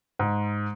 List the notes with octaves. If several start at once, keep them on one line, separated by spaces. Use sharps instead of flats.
G#2